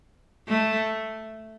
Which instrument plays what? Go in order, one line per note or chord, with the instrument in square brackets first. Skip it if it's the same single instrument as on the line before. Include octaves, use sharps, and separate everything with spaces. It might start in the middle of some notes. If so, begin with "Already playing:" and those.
[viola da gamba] A3